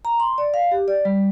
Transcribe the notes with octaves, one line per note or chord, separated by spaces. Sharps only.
A#5
C6
D5
F5
G4
D5
G3